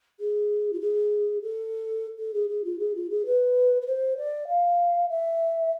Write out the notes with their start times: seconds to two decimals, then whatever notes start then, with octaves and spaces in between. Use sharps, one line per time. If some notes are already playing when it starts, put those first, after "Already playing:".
0.20 G#4
0.72 F4
0.81 G#4
1.42 A4
2.18 A4
2.34 G#4
2.49 G#4
2.64 F4
2.79 G#4
2.95 F4
3.10 G#4
3.25 B4
3.81 B4
3.86 C5
4.17 D5
4.48 F5
5.09 E5